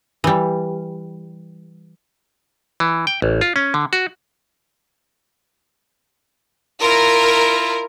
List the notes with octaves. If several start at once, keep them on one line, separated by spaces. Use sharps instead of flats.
E3 G3
E3
G5
A1
F4
C#4
D3
F#4
E4 F4 A#4